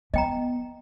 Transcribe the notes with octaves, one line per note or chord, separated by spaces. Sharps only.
F3 B3 D#5 G5 A#5